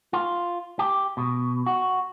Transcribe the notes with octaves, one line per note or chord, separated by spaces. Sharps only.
F4
G4
B2
F#4